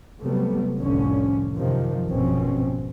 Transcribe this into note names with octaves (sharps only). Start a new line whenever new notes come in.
C3 F#3 G3 A3 B3
F1 C2 A2 D3 F3 C#4
F#2 C3 D#3 F3
G#1 F#2 B2 F3 C4 C#4